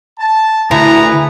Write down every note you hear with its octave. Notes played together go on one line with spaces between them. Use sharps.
A5
D2 E4 G#4 B4 A#5